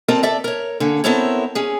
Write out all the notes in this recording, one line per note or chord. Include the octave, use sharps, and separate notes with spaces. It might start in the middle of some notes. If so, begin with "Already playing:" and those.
C4 F4 A4 A#4 D5 A5
A4 D5 E5
A#4 C#5
D3 A#3 C#4
B3 C4 E4 A4 A#4 C#5
C#4 G#4